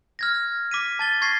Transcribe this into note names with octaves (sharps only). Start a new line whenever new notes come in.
F6 G#6 A#6
D6 B6 D#7
A5 A6 G7
C#6 G#6 A#6 C7